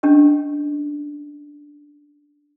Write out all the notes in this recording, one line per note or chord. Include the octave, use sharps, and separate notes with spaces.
C#4 D4 G4 D#5